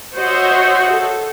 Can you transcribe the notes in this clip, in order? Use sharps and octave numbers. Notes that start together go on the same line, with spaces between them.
F#4 C5 C#5 D#5 E5 F#5
A4